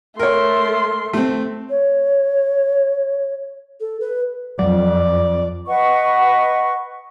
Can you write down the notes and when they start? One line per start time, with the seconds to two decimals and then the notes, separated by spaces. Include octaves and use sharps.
0.19 A3 A#4 C#5 C6
1.13 A3 C4
1.70 C#5
3.80 A4
4.00 B4
4.59 F2 F#3 D5
5.67 B4 D#5 F#5 C#6